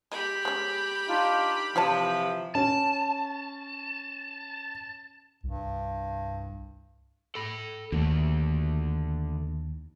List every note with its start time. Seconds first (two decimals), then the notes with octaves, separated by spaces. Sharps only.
0.12 G#3 G4 B5
0.45 G#3 C#4
1.08 D4 D#4 F4
1.76 C3 E3 F3 F4 C#5 A5
2.55 C#4 A5
5.43 C2 G2
7.35 A4 B5
7.92 D#2 D3 A3